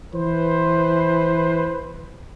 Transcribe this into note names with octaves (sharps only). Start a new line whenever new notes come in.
E3 B4 C5